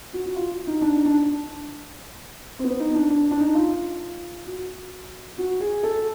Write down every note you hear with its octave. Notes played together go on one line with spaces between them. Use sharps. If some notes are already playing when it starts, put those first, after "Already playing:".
F#4
F#4
F4
D#4
D4
D#4
D4
C4
B3
D#4
D4
D4
D4
D#4
F4
F#4
F#4
G#4
A4